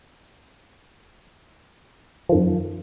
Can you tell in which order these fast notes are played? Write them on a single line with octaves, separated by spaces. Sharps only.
F3 D#3 F#2